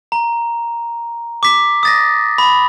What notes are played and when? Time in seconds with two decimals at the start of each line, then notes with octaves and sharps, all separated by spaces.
0.12 A#5
1.43 D6 B6
1.83 D#6 A6 A#6
2.38 B5